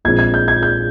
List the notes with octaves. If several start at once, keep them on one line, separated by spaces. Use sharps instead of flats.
A#1 A#2 G#3 C4 G#6
G#6
G6
G#6
G6